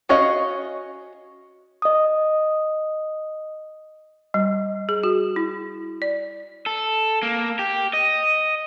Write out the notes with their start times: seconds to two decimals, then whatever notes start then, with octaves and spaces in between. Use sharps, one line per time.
0.09 C#4 F#4 C#5 D#5 F5
1.82 D#5 D#6
4.34 G3
4.89 G#4
5.03 F#4
5.36 E4
6.02 D5
6.66 A4
7.23 A#3
7.59 G4
7.93 D#5